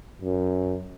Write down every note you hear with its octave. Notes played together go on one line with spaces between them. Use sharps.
F#2